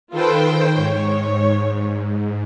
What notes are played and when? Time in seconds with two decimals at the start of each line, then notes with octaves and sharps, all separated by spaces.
0.12 D#3 F4 A4 B4 C5 G5
0.75 G#2 C#5